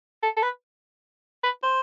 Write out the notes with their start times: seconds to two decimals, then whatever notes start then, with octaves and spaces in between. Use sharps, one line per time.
0.23 A4
0.37 A4
0.43 B4
1.44 B4
1.63 C5